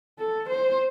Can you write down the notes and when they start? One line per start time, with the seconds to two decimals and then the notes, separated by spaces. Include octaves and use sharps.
0.19 A4
0.50 C5